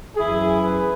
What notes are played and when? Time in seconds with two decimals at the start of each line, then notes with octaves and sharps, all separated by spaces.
0.17 F#2 E3 E4 G#4
0.63 G#4 B4